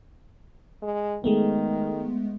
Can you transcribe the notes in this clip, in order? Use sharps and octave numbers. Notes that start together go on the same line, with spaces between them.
G#3
D#3 G#3 A3 B3